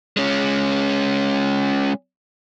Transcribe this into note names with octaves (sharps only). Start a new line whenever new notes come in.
G#3 C#4